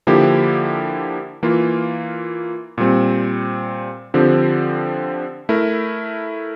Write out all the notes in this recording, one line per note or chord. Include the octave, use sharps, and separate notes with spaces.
D3 F3 A#3 E4 G4
E3 A#3 F4
A#2 G3 C4
D3 F3 C4 G4
A3 E4 A#4